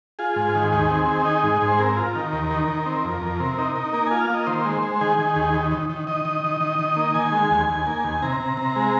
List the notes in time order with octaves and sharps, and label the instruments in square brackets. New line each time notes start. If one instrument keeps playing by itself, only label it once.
[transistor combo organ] F4 G#4
G#2
D#3
D#2 G#4
C4
D#3
D#4 G#4
G#2
G#2
C5
C4 A#4
F4
D#3
D#2
D#3
D#3
C4
F2
F2
C3
D#4
D#4
A#3 A#4
F4 G#5
F5
A#3 D#5
D#3 C5
G#3
G#3
D#3 G#4
D#3
D#2
D#3
D#3
D#3
D#3 D#5
D#3
D#3
D#3
D#3
A#3
D#3 G#5
G#3
D#2
D#2
A#3
D#2
C3 A#5
C3
C3
G#3